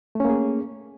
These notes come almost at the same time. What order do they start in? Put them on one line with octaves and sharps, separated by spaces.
A3 C#4 A#3 G#4